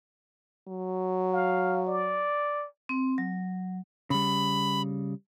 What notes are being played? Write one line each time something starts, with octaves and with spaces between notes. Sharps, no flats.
F#3
F5
D5
C4
F#3
C#3 G3 B5